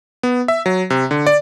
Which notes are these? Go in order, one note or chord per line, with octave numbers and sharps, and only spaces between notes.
B3
E5
F#3
C3
D3
D5